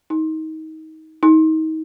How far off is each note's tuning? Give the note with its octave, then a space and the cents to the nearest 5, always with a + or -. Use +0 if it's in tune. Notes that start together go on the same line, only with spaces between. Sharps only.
D#4 +25
D#4 +30